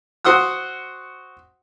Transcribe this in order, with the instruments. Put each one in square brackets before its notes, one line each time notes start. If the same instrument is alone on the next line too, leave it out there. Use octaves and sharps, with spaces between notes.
[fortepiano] F#4 C5 F#5 D#6 E6